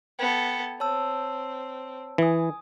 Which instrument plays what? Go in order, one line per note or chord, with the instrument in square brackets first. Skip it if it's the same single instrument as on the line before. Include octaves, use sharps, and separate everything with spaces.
[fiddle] B3 A4 [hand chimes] G5 G#6
[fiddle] C4 [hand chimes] C#5 A5 E6
[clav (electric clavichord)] E3 [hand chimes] G#5 D#6